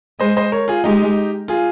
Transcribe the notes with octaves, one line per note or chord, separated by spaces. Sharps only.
G#3 C5 D#5
C5 D#5
A#4 C#5
F4 G#4
G#3 D#4 G4
F4 G#4